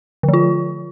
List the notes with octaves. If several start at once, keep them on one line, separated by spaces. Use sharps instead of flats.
D3
F3
F4